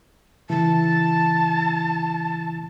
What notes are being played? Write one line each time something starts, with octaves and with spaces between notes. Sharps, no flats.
C#3 E3 E4 A5